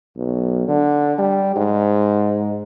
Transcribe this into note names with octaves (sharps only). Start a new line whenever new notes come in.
B1
D3
G3
G#2